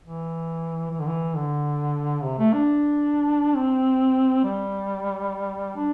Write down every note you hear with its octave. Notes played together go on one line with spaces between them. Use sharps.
E3
E3
D3
E3
D3
C3
A3
D4
C4
G3
D4